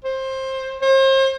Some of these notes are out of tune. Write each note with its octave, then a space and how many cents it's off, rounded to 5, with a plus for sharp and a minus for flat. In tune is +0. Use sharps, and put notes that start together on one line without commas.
C5 +20
C5 +40